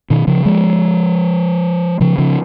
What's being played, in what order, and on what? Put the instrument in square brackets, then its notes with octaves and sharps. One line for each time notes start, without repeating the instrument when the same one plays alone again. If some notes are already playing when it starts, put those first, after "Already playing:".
[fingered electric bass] B2 D#3
C#3 F3
F3 G#3
C#3 F3
C#3 F3